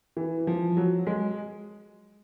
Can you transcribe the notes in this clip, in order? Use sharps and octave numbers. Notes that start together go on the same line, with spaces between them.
E3
F3
F#3
G#3